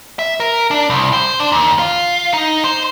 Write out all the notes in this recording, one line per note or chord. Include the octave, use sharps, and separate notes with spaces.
E5
A#4
D4
C2
C5
D4
D#2
F4
D#4
C5